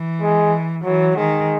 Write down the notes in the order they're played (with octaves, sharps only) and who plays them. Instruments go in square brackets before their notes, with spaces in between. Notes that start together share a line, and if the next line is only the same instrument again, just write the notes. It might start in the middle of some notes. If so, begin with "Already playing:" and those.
Already playing: [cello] E3
[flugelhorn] G#3
[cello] E3 [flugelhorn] F#3
[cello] D#3 [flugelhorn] G#3